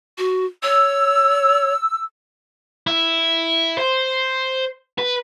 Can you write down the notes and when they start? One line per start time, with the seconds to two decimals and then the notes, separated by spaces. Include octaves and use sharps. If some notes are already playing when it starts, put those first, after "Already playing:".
0.18 F#4
0.63 C#5 E6
2.87 E4
3.78 C5
4.99 B4